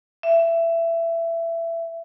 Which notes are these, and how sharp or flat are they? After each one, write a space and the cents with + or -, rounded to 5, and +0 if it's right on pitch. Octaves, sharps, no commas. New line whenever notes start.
E5 +20